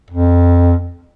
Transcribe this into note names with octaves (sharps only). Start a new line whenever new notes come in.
F2